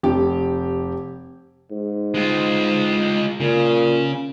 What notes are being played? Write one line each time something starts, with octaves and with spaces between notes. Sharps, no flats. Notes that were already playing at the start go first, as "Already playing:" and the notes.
F1 G4
G#2
G#3 F4
A#2 C#3